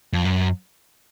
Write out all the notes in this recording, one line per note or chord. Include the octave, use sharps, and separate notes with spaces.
F2
F#2